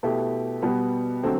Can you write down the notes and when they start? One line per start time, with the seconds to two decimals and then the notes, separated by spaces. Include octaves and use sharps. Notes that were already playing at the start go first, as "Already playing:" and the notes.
0.03 B2 A3 E4 G4
0.62 B2 G3 B3
1.23 D3 F#3 A3 C4